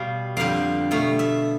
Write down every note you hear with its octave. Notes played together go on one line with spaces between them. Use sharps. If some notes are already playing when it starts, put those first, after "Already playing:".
Already playing: B2 G3 F5
F2 D3 G3 F5
B2 A3 F5
E5